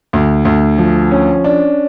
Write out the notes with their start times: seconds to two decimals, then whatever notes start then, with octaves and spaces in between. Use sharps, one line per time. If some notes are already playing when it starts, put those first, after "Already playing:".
0.13 D2
0.45 D2
0.78 F3
1.11 C#4
1.44 D4